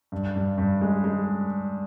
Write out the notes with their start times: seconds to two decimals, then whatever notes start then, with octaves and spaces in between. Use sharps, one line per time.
0.12 G2
0.36 G2
0.58 G2
0.81 G#3
1.04 G#3